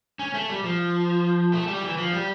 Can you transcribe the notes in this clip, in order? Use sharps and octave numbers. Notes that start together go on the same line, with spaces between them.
C#4
A3
G3
F3
A3
G3
E3
F3
G3